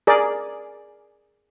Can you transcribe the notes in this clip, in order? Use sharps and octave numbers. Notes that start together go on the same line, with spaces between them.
G#4 A#4 D5